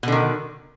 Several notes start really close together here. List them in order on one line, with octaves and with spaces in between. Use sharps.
B2 D3 D#3